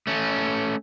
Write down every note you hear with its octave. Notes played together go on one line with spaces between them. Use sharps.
A3 C#4